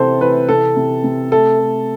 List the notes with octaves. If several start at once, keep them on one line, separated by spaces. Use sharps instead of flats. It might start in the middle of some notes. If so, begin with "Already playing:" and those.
Already playing: C3 E3 A4 C5
E3 B4
C3 A4
C3
C3
A3 A4
A3